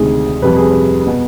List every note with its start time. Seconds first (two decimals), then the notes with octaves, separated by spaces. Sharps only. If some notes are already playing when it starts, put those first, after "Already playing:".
Already playing: D2 C3 D#3 G#3 G#4
0.42 F2 C3 G3 B4
0.56 G#4
0.71 B4
1.06 B2 B3